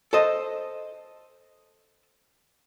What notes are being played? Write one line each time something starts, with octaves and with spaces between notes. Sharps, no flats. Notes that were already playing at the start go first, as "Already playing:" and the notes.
A4 C5 D#5